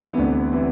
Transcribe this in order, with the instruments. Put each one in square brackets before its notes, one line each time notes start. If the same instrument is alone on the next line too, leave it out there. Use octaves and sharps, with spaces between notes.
[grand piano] D2 C3 E3 B3
C3 E3